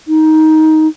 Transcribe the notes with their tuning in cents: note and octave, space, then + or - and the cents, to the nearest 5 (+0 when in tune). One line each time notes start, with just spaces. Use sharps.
D#4 +15